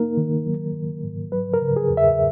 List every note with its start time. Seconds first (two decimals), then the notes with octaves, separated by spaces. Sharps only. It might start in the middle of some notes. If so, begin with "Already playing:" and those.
Already playing: A#3 D#4 A#4
0.17 D#3
0.46 F#3
0.75 D#3
1.04 G#2
1.32 F#3 B4
1.54 A#4
1.62 C#3
1.76 G#4
1.90 E2
1.97 E5